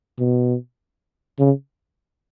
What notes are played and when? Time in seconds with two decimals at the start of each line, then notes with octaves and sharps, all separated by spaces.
0.19 B2
1.39 C#3